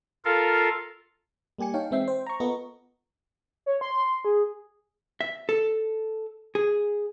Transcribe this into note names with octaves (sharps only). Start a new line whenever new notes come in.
F4 A4 A#4 F5
G3 A#3 G4 G#5 C#7
D#4 C#5 F5 G5 A5
E3 G#3 C4 E5 G5 C7
C5 G5
A#5 C#6
B3 F4 A4 A#4 D#5
C#5
C6
G#4
E5
A4
G#4